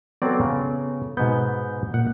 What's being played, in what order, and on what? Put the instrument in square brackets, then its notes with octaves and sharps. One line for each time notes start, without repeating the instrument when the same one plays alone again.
[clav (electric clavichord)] F#3 C4 D5 [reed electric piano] B3 A4
[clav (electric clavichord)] C#3
[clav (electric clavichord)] G#2 B3 [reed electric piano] B2 G6
[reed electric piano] A#2 [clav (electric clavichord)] F#5